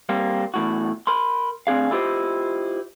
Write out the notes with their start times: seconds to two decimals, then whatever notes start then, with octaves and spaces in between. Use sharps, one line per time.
0.09 G3 A#3 C4
0.54 E2 A2 F#4
1.07 A#4 B5 C6
1.67 D2 C4 D4 G#4 F5
1.91 E4 F4 G4 B4 C5 D#5